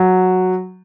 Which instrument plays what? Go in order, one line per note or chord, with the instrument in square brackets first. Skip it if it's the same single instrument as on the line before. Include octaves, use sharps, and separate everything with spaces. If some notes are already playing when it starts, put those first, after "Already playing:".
Already playing: [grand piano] F#3